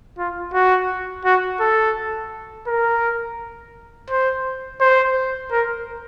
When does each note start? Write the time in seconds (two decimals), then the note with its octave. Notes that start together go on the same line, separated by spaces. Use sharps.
0.18 F4
0.54 F#4
1.25 F#4
1.60 A4
2.67 A#4
4.10 C5
4.81 C5
5.52 A#4